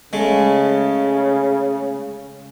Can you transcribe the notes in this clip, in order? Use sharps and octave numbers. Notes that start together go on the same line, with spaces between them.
C#3 G#3 A3